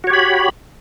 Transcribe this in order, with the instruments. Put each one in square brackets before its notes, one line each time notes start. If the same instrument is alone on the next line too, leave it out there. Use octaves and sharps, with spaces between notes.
[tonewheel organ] F#4
C#5
G4
B5